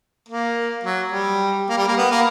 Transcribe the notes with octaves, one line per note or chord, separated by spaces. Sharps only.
A#3
F#3
G3
A#3
G3
A#3
B3
A#3